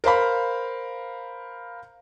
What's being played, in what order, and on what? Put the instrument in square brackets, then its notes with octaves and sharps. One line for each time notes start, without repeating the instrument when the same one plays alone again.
[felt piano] A#4 C5 F5 B5